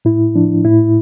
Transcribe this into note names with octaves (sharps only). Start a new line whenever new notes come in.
A2 E4
F3 D4
A2 E4